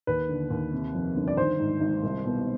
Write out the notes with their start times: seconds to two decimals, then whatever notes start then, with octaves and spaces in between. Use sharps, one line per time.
0.07 D#2 B4
0.29 D3
0.50 D#2
0.73 C3
0.95 F2
1.16 G1
1.28 D5
1.37 D#3 C5
1.60 G#2
1.81 G#1
2.03 C2
2.25 B2